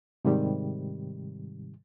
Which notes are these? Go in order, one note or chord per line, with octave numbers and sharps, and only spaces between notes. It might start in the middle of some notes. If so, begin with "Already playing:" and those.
G#2 C3 D#3 G3